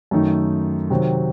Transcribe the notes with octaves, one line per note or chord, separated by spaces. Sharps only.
F#2 D#3 A3 D#4
C3 D#3 F#3 C4